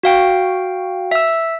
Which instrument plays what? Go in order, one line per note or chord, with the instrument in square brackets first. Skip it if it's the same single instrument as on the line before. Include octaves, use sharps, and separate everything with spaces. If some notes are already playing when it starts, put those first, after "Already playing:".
[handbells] F#4 F5 G5
E5 E6